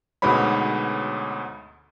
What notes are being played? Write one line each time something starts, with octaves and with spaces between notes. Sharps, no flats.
D2 G#2 B2 B3 C#5 B5